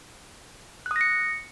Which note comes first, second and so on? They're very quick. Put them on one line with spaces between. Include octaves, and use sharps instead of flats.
F#6 D#6 A#6 C#7